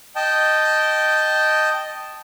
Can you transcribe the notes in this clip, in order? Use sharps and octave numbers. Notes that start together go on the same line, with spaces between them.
D#5 G5 A5